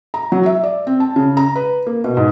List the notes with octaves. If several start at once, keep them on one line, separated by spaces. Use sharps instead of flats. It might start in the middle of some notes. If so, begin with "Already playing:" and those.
A#5
F#3
E5
D5
C4
A5
C#3
A#5
B4
A#3
B2
G#2